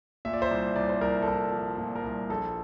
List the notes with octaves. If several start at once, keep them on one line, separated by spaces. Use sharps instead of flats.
A#2 E5
D5
C5 E5
C2
C2 D5
C5
C2 A#4 D5
A4
C2 A#4
F3
A#2
A#4
C2
A#1 A4